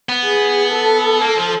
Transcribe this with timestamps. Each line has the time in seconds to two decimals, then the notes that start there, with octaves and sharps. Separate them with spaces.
0.09 B3
0.25 G#4
0.73 A4
1.21 A#3
1.37 F3